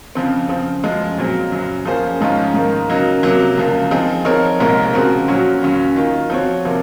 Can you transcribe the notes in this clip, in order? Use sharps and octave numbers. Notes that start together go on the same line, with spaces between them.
F2 C#3 F3 C4
C#3 F3 C4
F#2 F3 G#3
A#2 F#3 C4
F#2 C#3 F#3
F3 A#3 C#4 G#4 C5
G#2 F3 G#3 C#4 F4
G#2 D#3 A#3
C#3 F#3 A#3 D#4
F2 C3 F#3 A#3
C#2 C#3 F3 A#3
F3 C4 D#4 G#4
F3 C4 D#4 A#4 C#5
C2 A#2 G#3 D#4 A#4
C#3 F3 C4 F#4 A#4
A#2 F#3 C#4 F#4 C#5
D#2 C#3 F#3 C#4
D#3 A#3 F4
F3 C4 F#4 C#5
C3 F3 A#3